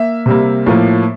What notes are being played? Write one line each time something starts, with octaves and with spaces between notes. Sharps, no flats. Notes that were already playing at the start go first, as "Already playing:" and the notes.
Already playing: A#3 E5
C3 G3 A#3
A2 F3 A#3